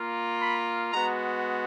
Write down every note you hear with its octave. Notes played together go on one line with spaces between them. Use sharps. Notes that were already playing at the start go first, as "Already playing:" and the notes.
Already playing: A#3 F4
B5
G#3 B3 F#4 A#5